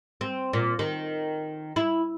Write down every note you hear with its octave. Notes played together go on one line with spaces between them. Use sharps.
C4
A#2
D#3
E4